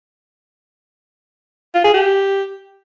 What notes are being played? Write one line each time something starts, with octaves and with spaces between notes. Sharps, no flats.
F4
G#4
G4